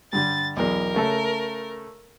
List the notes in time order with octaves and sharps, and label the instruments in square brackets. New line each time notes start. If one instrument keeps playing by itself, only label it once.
[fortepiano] G2 D3 G3 [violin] A6
[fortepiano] B1 E2 [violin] A#4
[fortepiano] C#3 A3 A4